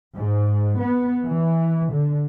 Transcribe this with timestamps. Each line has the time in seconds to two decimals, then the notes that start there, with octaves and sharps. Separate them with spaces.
0.17 G#2
0.80 B3
1.25 E3
1.93 D3